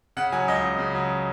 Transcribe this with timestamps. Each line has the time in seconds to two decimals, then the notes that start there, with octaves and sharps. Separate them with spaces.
0.17 C#3 F#5
0.32 F#3 G#5
0.48 C#2 D#5
0.64 C#2
0.79 C#3
0.95 F#3